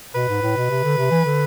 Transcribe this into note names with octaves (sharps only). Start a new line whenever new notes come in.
B2 B4
G#2
A2
B2
C3
D3
C3
E3
D3